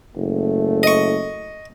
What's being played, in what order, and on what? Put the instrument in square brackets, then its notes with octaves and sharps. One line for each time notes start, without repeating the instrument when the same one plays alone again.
[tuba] F#1 [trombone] A3
[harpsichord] D#5 C#6